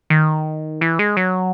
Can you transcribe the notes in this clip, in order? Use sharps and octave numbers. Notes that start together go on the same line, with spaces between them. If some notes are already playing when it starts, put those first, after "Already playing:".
D#3
E3
G#3
F#3